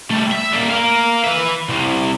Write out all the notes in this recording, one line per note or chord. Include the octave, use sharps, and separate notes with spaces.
G3 A3
E5
G3 A#3
A#4 F5
B4 E5
C2 C3